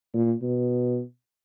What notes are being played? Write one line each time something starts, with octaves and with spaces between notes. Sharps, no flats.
A#2
B2